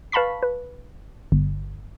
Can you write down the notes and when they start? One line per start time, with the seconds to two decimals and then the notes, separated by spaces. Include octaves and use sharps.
0.12 B4 F5 A5 B5 C#6 B6
0.43 B4
1.32 G1